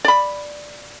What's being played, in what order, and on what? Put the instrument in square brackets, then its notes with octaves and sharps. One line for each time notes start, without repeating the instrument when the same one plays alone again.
[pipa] D5 B5